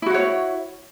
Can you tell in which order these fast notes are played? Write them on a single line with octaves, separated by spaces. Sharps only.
E4 F#4 F#5 C#5